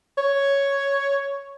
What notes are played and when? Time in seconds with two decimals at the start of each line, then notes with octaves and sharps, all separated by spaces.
0.18 C#5